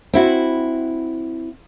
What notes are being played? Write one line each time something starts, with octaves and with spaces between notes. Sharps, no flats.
C4 E4 F#4